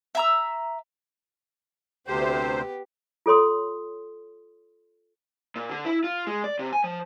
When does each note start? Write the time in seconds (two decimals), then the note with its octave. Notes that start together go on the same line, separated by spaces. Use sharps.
0.15 E5 A#5 E6
2.07 D2 C3 B3 G4 C5
3.26 F4 A4 C#5 C6 D#6
5.56 A#2
5.70 D3
5.85 E4
6.04 F4
6.27 G#3
6.44 D5
6.59 C3
6.73 G#5
6.84 F3